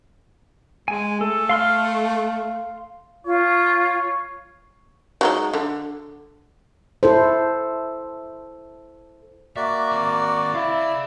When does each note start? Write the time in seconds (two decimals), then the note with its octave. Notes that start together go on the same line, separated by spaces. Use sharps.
0.88 G#3 G#5
1.21 A3 A4
1.49 F5 C6 F6
3.25 F4 C#5
5.21 F#3 G#3 D#4
5.53 D3
7.03 E4 A4 C5
9.56 A#3 F#4 D5 E5
9.92 D#3 C4
10.54 E4 G#4 F5